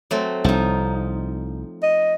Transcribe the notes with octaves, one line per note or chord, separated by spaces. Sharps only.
F#3 A3 C4
C2 F3 D#4
D#5